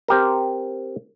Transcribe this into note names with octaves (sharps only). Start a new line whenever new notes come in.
C4 G4 A#4